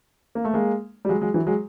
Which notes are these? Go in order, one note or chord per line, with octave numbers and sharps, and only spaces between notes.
A#3
A3
G#3 A#3
G3
F#3 G#3
F#3 G#3
E3 F#3
F#3 G#3